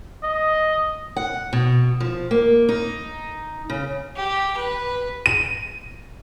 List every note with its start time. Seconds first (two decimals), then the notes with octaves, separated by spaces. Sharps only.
0.24 D#5
1.16 F#5
1.53 B2
2.00 F3
2.31 A#3
2.69 D#4
3.70 C#3
4.16 G4
4.57 B4
5.26 D#7